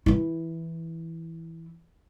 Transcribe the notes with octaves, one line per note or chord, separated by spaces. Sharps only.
E3 E4